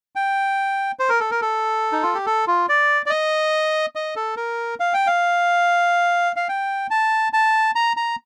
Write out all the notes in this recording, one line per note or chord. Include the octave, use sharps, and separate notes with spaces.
G5
C5
A#4
A4
A#4
A4
D#4
F4
G4
A4
F4
D5
D5
D#5
D#5
A4
A#4
F5
G5
F5
F5
G5
A5
A5
A#5
A#5